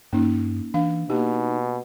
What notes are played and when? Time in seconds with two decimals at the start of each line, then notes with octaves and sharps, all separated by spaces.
0.13 G2 A#3 C#4 D#4
0.74 E3 D4 F5
1.10 B2 A#3 D#4 G4